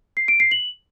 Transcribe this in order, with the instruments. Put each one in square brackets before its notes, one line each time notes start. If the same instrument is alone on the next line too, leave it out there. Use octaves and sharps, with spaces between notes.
[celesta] C7
D7
C7
F#7